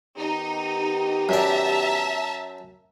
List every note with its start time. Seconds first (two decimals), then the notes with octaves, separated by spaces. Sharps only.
0.18 D#3 B3 D#4 G4
1.29 F#2 D5 E5 A5 A#5